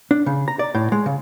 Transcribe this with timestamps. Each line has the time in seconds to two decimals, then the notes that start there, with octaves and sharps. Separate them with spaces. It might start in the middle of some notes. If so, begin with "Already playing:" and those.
0.11 D4
0.26 C#3
0.48 A#5
0.59 D5
0.75 A2
0.92 G#3
1.06 C#3